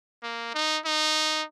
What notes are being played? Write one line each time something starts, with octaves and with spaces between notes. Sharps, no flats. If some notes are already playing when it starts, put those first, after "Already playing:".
A#3
D#4
D#4